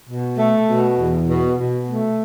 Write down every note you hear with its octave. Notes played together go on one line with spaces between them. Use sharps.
B2
A3
B2
E2
B2
B2
A3